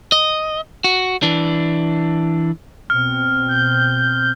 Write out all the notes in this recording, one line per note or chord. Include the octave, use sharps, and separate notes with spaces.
D#5
F#4
E3 D4
B2 C4 F6
G6